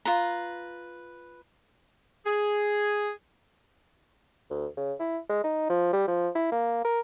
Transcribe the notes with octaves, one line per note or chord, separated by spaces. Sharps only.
F4 B4 A#5
G#4
D2
C#3
E4
G#3
D#4
F3
G3
F3
E4
A#3
A#4